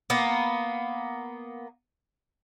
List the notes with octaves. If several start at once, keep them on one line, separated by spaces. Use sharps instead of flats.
A#3 B3